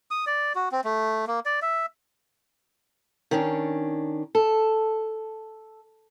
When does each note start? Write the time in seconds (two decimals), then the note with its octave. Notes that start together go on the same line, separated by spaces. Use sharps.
0.11 D#6
0.27 D5
0.55 F#4
0.72 C4
0.84 A3
1.27 A#3
1.46 D5
1.62 E5
3.31 D#3 C#4 D4
4.35 A4